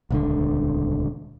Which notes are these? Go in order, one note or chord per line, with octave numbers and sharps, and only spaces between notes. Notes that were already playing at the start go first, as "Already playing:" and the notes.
D#1 C#2 D3